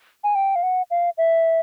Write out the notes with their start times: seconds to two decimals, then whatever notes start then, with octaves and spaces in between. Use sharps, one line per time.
0.24 G#5
0.35 G5
0.56 F5
0.63 F#5
0.91 F5
1.18 E5